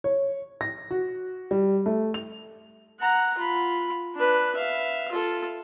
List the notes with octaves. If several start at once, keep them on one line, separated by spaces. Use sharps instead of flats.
C#5
A#6
F#4
G3
A3
F7
F#5 A#5
F4 B5
D4 B4
E5 F5
F4 A4